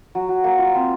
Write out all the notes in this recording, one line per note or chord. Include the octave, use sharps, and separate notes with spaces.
F#3
F#3
A#3
F4
C4